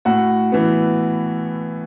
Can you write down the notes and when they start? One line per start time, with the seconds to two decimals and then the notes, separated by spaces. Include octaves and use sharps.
0.05 A2 F#4 F#5
0.52 E3 B3